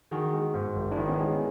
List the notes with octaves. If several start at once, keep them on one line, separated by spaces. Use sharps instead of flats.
D#3 F#4 G#4
G#3
G#2
G#1
D4 E4
D#3
B3 C#4
G#3